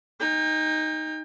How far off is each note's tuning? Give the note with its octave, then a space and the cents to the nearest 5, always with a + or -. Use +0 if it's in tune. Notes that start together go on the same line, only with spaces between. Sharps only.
D#4 +0 G5 +40